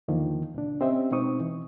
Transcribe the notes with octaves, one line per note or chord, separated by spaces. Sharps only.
E2 D3 D#3 F3 A#3
C#2 A#2 D4
C4 C#4 G4 C5 D#5 E5
B2 G#3 C4 D#4 C#6 D#6
E3